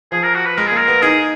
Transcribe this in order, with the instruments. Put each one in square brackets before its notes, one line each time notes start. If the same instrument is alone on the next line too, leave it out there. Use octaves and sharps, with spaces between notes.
[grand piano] F3 [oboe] G#4
[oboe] A#4
F#4
B4
[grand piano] G#3 [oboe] A#4
[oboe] G#4
[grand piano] A#3 [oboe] A#4
[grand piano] B3
[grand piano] D#4 [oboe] G#4